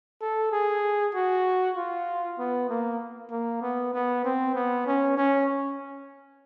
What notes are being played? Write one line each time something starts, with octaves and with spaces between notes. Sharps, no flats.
A4
G#4
F#4
F4
B3
A#3
A#3
B3
B3
C4
B3
C#4
C#4